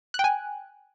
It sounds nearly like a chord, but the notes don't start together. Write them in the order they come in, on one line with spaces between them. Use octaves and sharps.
F#6 G5 G#5